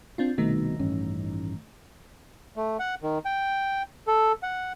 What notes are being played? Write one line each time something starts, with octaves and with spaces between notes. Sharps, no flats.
C4 D4 F4
C2 B2 D#3 A3 D#4
A1 G2 C#4
A3
F#5
D#3
G5
A4
F#5